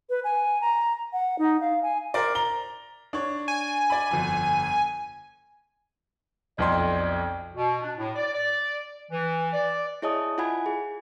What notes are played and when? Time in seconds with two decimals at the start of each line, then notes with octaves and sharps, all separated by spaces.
0.10 B4
0.24 G#5
0.61 A#5
1.13 F#5
1.39 D#4
1.61 F5
1.83 G#5
2.14 A#4 C5 D5
2.35 A#5 G7
3.13 D4 C#5
3.48 G#5
3.90 D5 B5
4.11 G1 F2
6.58 B1 F2 D5 C6
7.55 B2
7.82 D4
7.97 A2
8.15 D5
8.33 D5
9.11 E3
9.52 D5
10.02 E4 G#4 C#5 D#5 A5 D#6
10.38 E4 F4 F#5 G#5 B5 G#6
10.66 G#4